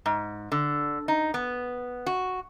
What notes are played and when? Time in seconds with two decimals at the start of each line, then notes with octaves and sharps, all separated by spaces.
0.06 G#2
0.52 D3
1.08 D#4
1.34 B3
2.06 F#4